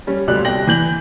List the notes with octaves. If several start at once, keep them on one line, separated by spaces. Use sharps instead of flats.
G3 C#4
G1 D2 G3 D5 F#6
C2 G5 A#6 F#7
E3 G6 F#7